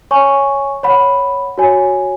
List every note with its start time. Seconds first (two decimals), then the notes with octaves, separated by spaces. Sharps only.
0.11 C#5 G#5 C#6
0.83 C#5 F#5 B5
1.58 F#4 C#5 G#5